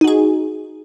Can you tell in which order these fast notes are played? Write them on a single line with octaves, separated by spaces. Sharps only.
D#4 F#4 G#4